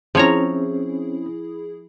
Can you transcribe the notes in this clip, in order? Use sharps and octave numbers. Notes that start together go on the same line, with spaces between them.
F3 C4 C#4 E4 G#4 C#5 A#5